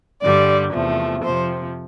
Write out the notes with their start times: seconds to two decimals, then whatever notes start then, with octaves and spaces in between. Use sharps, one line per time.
0.21 G2 D3 G3 D5
0.73 E2 C3 F3 A3
1.24 F2 C3 F3 C5